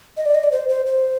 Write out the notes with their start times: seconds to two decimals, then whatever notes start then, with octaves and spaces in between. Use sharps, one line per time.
0.17 D#5
0.26 D5
0.35 D#5
0.44 D5
0.52 C5
0.69 C5
0.86 C5